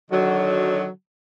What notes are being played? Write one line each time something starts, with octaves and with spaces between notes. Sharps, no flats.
D3 D#3 F#3